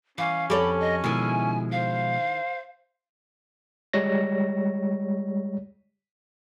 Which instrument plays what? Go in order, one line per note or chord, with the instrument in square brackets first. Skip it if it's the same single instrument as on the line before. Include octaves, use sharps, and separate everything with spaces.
[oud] E3 [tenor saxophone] C#4 [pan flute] F5
[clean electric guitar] F2 [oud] G4 A4 C#5 [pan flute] B5
[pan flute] D#5
[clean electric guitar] B2 F3 G#3 [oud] D#3 E4 [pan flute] G#5
[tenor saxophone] C5 [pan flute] F5
[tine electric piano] G3 G#3 C#5 A#6